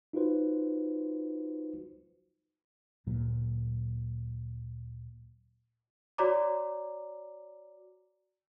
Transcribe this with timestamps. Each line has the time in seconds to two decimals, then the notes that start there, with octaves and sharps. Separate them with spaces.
0.13 D#4 F4 F#4 B4 C5
3.06 D2 A#2 F#3
6.18 F#4 C#5 D5 A#5 D6